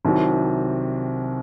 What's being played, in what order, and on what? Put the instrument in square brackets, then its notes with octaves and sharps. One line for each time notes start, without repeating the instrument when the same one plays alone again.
[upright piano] C2 C3 D#3 F#3